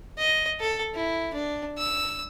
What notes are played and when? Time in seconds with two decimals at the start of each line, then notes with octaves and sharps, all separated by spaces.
0.18 D#5
0.60 A4
0.94 E4
1.33 D4
1.78 E6